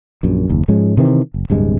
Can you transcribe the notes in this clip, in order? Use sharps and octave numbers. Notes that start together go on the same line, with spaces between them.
A#1 F#2
F#1 D#2
G#2 F3 G#3 C#4
C3 D#3 E3 C4
F#1
D1 G2 C3 G#3